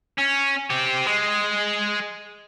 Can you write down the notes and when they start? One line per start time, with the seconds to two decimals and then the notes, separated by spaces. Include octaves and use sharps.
0.18 C#4
0.70 C4 G4
1.07 G#3